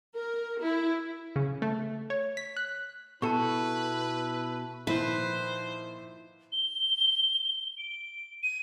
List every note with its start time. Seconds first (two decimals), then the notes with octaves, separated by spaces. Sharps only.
0.16 A#4
0.61 E4
1.36 C#3
1.62 A3
2.10 C#5
2.37 B6
2.57 F#6
3.22 B2 E4 A4 B4 A5 C#6
4.87 A#2 D#3 F3 E4 B4 C5
6.52 G7
7.78 D7
8.43 D#7